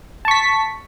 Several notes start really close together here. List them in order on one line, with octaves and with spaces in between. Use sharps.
A5 C#6 B6